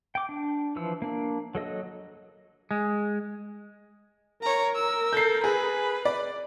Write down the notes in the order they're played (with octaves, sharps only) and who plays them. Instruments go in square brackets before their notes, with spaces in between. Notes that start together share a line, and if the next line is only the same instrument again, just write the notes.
[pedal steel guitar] G5 D6
D4
E3 F3 E6
A#3 D4
F#3 A4 D#5 E6
[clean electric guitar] G#3
[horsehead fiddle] A#4 [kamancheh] C#5 A#5
[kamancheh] E6
[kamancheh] A4 [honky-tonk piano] G6 C7
[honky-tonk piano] G#4 [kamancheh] B4
[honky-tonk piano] D5